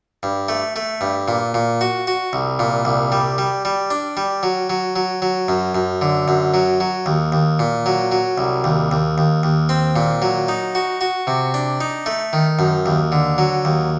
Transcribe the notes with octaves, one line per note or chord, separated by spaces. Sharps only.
G2
A3
A3
G2
A#2
A#2
F#4
F#4
C2
A#2
C2
G3
G3
G3
D4
G3
F#3
F#3
F#3
F#3
F#2
F#2
D3
F#2
F#3
F#3
D#2
D#2
A#2
F#3
F#3
C2
D#2
D#2
D#2
D#2
C4
A#2
F#3
D#4
F#4
F#4
C3
D4
D#4
A3
D#3
F#2
D#2
D3
F#3
D#2